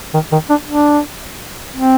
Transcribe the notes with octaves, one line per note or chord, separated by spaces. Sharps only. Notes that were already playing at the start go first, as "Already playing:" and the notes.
D#3
D#3
D4
D4
C4